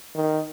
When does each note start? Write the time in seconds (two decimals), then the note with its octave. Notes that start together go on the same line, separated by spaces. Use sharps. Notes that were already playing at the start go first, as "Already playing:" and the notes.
0.16 D#3